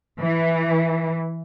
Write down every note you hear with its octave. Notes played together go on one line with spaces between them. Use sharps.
E3